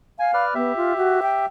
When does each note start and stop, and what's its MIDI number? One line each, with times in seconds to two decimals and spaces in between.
0.19 0.44 77
0.19 0.31 80
0.34 0.54 71
0.34 0.54 74
0.34 0.54 89
0.55 0.75 59
0.55 1.46 67
0.55 1.46 76
0.77 0.93 65
0.97 1.20 66
1.22 1.45 79